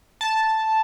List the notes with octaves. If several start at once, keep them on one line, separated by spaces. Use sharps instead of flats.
A5